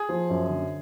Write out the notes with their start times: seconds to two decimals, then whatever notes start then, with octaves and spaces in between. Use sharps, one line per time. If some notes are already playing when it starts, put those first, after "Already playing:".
Already playing: G#4
0.09 F3
0.30 F#2
0.50 D3